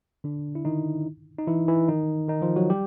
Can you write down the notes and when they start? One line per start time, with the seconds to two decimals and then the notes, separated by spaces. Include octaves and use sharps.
0.24 D3 D4
0.55 E4
0.65 D#3 D#4
1.38 D#4
1.47 E3 E4
1.68 E3 E4
1.88 D#3 D#4
2.28 D#3 D#4
2.42 F3 F4
2.56 F#3 F#4
2.70 G3 G4